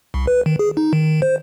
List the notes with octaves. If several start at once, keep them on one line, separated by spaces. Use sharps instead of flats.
C2
B4
D#3
G#4
D#4
D#3
C5